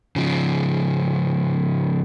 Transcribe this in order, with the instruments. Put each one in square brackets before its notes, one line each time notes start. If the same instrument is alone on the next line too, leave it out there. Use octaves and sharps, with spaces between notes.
[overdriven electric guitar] C#3 F3